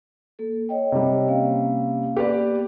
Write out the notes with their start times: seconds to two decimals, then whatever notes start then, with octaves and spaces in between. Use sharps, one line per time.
0.39 A#3 A4
0.69 C#5 D#5 G5
0.92 C3 G3
1.28 A#3 C#4 F5
2.17 A#3 B3 G4 B4 D5